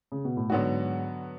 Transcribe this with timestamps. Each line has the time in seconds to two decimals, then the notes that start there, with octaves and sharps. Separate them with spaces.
0.12 C#3
0.25 B2
0.37 A2
0.50 G#2 D3 F#3 B3 F#4